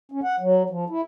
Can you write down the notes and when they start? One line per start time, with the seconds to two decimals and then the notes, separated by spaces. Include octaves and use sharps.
0.12 C#4
0.23 F#5
0.40 F#3
0.70 F3
0.90 E4